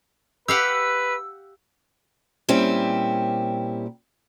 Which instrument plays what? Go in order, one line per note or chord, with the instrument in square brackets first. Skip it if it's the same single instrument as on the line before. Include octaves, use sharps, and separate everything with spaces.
[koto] G4 F5 F#5 [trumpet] B4 [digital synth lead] E6
[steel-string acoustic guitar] A#2 G3 C4 C#4 E4 G4